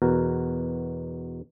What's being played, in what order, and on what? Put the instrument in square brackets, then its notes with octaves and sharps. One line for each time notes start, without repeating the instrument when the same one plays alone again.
[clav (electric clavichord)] E2 B2 F#4 A#4